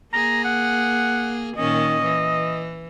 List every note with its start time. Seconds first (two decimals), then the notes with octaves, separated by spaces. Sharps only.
0.13 A#3 G#4 A#5
0.44 F#5
1.57 A#2 D#3 C#4 D#5
2.03 E3